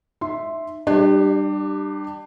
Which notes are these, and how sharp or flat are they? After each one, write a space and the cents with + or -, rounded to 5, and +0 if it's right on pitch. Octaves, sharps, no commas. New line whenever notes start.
D#4 -15 E5 +0 C6 +0
G3 -5 D4 +30 G4 +0